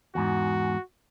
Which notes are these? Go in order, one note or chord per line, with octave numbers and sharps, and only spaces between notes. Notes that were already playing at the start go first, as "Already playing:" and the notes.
E2 G#2 F#4